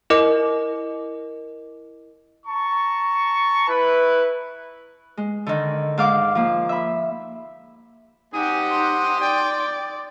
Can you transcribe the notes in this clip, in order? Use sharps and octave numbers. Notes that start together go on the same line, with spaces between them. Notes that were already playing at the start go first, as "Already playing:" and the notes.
E4 A#4 D#5 D6
A5 A#5 C#6
E4 B4
G#3
D3 D#3
G#2 F5 D6
F3 A#3
E5 B5
F#3 C4 D#4 G4 F#5 G#5 D#6
C6
D5 G5